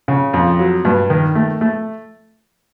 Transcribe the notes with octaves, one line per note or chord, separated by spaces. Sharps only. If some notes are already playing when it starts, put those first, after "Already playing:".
C#3
F2
F#3
G2
D#3
A3
A3